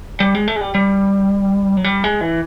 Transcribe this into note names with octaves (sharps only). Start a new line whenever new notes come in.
G3
G#3
A3
G#3
G3
G3
F#3
G3
G#3
E3